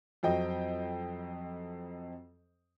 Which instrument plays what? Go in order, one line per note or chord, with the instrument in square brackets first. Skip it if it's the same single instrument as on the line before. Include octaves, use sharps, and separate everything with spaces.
[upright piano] F2 F#3 C4 D#5 G5